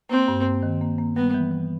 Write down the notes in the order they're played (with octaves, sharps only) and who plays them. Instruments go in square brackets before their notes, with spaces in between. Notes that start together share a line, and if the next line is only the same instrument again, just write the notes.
[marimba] A#3 [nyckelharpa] C4
[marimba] G2
A#3
D#3
A#3
A#3
[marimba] G3 [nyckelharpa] B3
[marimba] E3
E3